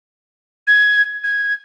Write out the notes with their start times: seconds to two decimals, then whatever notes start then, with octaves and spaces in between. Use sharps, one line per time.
0.67 G#6
1.23 G#6